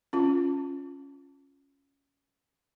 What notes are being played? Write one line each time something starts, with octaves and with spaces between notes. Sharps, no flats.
C#4 F4